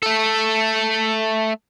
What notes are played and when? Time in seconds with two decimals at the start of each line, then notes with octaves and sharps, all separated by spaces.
0.03 A3 A4